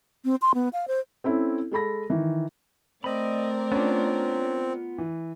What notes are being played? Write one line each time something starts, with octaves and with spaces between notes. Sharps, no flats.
C4
C6
B3
F5
C5
C4 C#4 E4 A4
G#3 A4 B5 A#6
D#3 E3
A3 C4 A#4 D5 D#5 B5
B3 C#4 D4 F4
E3